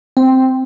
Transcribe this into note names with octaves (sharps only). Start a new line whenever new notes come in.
C4